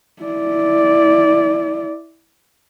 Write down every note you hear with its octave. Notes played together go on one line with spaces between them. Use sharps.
E4 D5